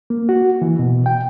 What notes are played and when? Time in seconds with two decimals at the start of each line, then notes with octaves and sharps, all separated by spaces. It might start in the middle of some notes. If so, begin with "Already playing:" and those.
0.10 A#3
0.29 F#4
0.62 E3
0.79 B2
1.06 G5